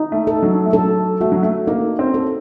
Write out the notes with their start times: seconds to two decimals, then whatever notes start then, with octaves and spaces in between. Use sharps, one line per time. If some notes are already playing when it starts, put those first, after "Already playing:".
Already playing: D#4
0.12 A3
0.27 A4
0.43 F#3
0.66 A3
0.73 F#3 A4
1.21 A3 F#4
1.32 F#3
1.43 A3
1.67 A#3 D#4
1.99 C4
2.14 A4